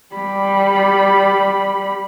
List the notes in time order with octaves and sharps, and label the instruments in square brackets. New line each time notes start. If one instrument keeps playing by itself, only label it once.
[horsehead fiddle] G3 B5